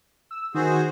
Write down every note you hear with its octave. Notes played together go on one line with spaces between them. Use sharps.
E6
D#3 F#4 G#4 C5